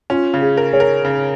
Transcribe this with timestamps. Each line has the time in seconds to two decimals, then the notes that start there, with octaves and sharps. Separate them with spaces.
0.10 C#4 F4
0.34 C#3
0.42 G#4
0.57 A#4
0.73 G#4 C#5
0.80 A#4
1.05 C#3